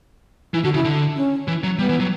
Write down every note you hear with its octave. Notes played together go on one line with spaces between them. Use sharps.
E3 E4
D3 F#4
C#3 E4
D3
C#4
E3
F#3
G3 B3
E3
F#3